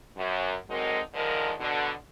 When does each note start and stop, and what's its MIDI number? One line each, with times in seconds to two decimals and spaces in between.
0.17 0.56 42
0.70 1.00 50
0.70 1.00 54
0.70 1.00 56
0.70 1.00 60
0.70 1.00 63
0.70 1.00 70
1.14 1.54 39
1.14 1.54 50
1.14 1.54 51
1.14 1.54 53
1.14 1.54 56
1.14 1.54 70
1.60 1.91 47
1.60 1.91 50